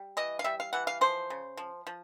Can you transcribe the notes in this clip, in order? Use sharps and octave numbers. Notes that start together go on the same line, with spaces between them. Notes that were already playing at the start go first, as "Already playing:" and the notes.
Already playing: G3
E3 D#5
F5
G3 E5
F5
E3 F#5
F5
F3 C5
C#3
F3
F3